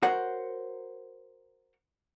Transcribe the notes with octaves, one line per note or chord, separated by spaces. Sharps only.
F#4 A#4 C5 C#5 F#5